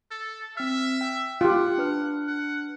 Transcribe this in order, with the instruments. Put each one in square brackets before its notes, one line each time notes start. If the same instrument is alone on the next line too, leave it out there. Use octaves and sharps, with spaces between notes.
[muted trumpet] A4
[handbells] C4 F6 [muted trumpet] E5
[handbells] G5
[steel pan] F4 G4 [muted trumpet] F#5 [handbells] G5
[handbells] D4 B4 F6
[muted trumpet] F#5